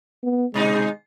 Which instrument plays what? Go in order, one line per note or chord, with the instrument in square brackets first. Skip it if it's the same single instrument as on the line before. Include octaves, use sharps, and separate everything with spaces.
[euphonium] B3
[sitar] G#2 B2 D#4 [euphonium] G#3